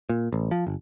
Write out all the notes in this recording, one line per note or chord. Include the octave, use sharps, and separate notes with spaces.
A#2
A1
F3
G1